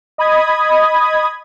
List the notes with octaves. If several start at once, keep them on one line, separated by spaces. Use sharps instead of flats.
D#5 B5 D#6 G#6